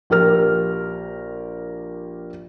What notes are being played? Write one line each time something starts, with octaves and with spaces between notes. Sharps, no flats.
A#1 G4 A#4 F6